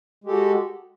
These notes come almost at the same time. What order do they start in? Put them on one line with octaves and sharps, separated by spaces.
G#3 G4 A4 F#4